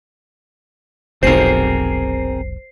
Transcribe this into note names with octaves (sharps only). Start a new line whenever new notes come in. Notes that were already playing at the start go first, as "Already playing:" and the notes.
F1 B1 C4 G#4 A#4 C5 C7